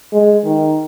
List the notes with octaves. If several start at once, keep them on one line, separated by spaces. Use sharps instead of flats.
G#3
D#3